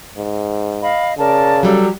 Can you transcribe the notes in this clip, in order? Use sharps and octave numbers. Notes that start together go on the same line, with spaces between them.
G#2
D#5 F5 B5
C#3 A#4 D5 A5
F#3 G3 A4